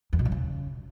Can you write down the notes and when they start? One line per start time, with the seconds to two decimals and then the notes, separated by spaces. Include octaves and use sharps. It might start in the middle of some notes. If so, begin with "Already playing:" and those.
0.13 E2
0.19 B2
0.25 F#2
0.32 C#3